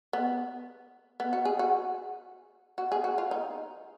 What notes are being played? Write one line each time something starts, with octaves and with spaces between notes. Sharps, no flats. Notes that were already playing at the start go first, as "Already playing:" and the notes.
B3
B3
F#4
G#4
F#4
F#4
G#4
F#4
F4
D#4